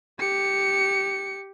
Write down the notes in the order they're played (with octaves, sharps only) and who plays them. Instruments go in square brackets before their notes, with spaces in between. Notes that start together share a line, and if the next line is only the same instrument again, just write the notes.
[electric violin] G4 C#7